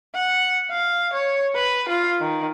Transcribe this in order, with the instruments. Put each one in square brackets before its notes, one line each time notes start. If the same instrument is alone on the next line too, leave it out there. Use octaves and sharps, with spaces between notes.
[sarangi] F#5
F5
C#5
B4
F4
D#3